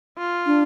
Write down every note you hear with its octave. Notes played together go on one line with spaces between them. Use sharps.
F4
D4